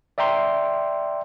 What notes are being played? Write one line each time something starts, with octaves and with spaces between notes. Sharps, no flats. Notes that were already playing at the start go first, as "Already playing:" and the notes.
D5 E5 G5 A#5 C6